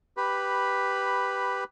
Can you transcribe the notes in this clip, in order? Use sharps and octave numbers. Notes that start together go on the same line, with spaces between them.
G4 B4 B5